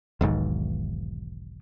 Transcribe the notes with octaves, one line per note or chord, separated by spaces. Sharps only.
E1 B1 G#2 D#3